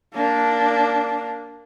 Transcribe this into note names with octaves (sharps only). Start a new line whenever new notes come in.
A#3 D4